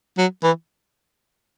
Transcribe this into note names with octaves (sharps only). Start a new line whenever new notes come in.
F#3
E3